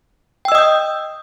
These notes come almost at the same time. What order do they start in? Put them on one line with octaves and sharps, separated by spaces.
G5 E6 D#5 D#6 G6